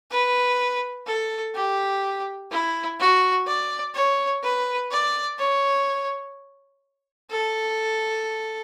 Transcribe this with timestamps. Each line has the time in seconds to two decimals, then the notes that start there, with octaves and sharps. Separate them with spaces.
0.11 B4
1.07 A4
1.55 G4
2.52 E4
3.00 F#4
3.47 D5
3.95 C#5
4.43 B4
4.91 D5
5.39 C#5
7.31 A4